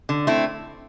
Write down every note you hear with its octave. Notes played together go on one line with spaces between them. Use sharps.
D3
A3 C4 E4